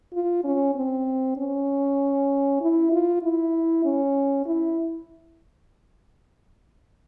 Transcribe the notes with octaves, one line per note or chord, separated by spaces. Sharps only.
F4
C#4
C4
C#4
E4
F4
E4
C#4
E4